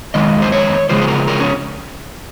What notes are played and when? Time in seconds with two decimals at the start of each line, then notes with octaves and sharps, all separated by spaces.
0.14 F2 D#3 G#3 D#5
0.42 C5
0.52 C#5
0.89 C#3 F3 G#3 C5
1.02 C5
1.08 A#4
1.28 A#4
1.40 C#4